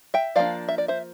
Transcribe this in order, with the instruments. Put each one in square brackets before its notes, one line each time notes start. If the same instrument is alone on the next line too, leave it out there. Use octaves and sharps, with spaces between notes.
[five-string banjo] E5 G5
F3 A#3 D4 D5 F5
E5
D5
C5 E5